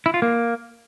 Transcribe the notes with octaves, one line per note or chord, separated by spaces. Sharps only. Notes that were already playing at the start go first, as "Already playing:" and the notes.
E4
F4
A#3